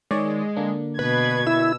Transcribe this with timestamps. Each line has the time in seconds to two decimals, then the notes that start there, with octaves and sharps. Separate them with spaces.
0.11 D#3 G#3 C#5 D5
0.56 D3 A#3 D4
0.99 B2 B4 G#6
1.47 E4 E6